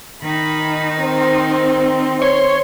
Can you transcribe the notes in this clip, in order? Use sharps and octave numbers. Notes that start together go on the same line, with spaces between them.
D#3 D#4 B5
C4 C5
C#5 C6